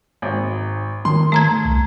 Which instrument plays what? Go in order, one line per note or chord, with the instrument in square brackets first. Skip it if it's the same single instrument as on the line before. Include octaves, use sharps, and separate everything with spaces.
[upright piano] G#1
[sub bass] D#3 [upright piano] C6
[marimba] A3 A#5 G#6
[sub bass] C2